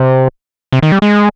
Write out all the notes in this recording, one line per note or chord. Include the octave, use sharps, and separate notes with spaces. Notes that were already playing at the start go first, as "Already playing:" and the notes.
Already playing: C3
C3
D#3
G3
G#3